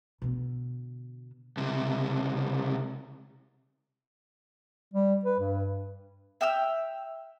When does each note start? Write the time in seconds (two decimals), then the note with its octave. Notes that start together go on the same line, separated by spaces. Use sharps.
0.22 B2 D3
1.57 C#2 C3
4.94 G3
5.25 B4
5.39 G2
6.41 E5 G5 E6 F6